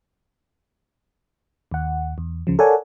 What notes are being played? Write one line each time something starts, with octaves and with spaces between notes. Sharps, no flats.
D#2 F#5
E2
C#2 C#3 F3
A4 A#4 C#5 D5 F#5 G#5